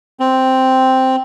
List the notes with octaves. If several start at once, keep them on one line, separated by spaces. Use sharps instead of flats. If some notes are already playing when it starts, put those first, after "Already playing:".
C4